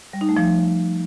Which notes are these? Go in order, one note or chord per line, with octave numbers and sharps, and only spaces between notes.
G3
D#4
A3
F3